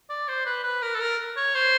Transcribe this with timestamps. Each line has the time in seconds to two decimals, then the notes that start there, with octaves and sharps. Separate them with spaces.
0.09 D5
0.28 C5
0.46 B4
0.63 B4
0.82 A#4
0.95 A4
1.00 A#4
1.36 C#5
1.55 C5